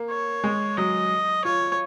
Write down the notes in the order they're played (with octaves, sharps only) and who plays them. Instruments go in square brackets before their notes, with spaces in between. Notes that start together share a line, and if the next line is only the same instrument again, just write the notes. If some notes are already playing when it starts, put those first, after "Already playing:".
Already playing: [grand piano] A#3
[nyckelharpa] C#5
[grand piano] G#3
[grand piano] F#3 [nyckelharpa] D#5
[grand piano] F4 [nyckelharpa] C#5